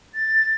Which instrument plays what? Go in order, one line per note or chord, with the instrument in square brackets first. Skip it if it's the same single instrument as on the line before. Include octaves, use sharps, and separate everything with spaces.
[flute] A6